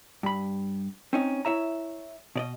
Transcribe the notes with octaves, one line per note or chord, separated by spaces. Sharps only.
G2 B5
C4 C#4 D#4
E4 C#5 E5 A#5
B2 D5 D#5